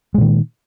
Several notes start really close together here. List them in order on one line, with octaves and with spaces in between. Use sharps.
G#3 A#2 D#3